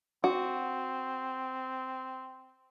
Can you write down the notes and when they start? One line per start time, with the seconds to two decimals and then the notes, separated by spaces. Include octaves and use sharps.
0.24 C4 F#4